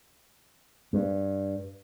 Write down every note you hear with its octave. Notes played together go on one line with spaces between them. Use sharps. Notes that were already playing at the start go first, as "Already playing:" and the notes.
G2